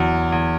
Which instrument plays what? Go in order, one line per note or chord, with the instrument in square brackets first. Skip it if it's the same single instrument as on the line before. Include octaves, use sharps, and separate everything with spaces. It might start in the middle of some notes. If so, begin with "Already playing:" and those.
Already playing: [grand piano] E2 F#3
E2